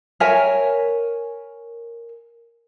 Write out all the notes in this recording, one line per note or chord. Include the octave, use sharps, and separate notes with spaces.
A#4 C#5 E5 G#5